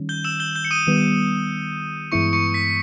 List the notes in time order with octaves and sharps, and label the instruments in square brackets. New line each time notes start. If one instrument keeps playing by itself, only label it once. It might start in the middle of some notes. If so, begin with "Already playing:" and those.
Already playing: [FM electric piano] D#3 G3 C#4
[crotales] G6 G7
E6 E7
G6 G7
G6 G7
C#7
D#6 D#7
[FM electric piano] D#3 G3 B3
[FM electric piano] G2 E3 G#3 B3 E4 [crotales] C#6 C#7
[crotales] C#6 C#7
B6